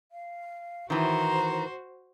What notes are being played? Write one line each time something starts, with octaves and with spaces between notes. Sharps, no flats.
F5
D#3 E3 F#4 C5 A#5